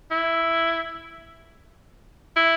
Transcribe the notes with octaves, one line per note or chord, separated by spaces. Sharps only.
E4
E4